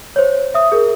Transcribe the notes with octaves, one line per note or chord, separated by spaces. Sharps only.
C5 C#5
E5 D#6
G#4 A#4